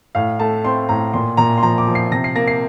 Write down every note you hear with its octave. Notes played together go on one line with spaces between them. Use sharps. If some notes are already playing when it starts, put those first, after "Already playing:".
A2 F5
A3 A5
C4 C6
A2 A#5
A#2 C6
A#2 A#5
C6
F3 A#5
D6
F3
C7
C3 A#6
C7
A#3 A#6
C7